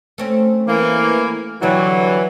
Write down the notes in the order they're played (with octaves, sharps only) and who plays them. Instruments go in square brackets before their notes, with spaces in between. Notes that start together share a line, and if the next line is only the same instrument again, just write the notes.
[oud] A3 C4 C#4
[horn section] E3 A#3
[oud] D3 G3 G4 [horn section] E3 F#3